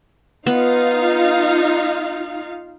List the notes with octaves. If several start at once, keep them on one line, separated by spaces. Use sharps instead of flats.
B3 D#4 F4 F5